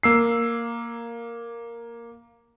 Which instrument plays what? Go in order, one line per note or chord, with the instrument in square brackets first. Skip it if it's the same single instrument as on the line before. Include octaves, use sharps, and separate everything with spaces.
[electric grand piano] A#3 E6 C7